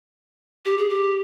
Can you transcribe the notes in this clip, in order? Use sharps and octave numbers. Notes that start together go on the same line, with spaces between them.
G4
G#4
G4